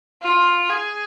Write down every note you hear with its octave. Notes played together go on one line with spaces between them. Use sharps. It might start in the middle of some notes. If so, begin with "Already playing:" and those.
F4
G#4